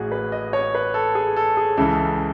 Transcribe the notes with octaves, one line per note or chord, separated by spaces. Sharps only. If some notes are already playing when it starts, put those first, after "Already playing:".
Already playing: A1 A2 E3 F#4 G#4
B4
D#5
C#5
B4
A4
G#4
A4
G#4
C#2 C#3 E3 A4